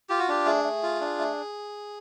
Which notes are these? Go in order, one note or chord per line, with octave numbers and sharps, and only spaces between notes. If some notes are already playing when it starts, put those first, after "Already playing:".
F4 G4
F#4
D4 G4
A3 G#4
A3
F4
D4
A3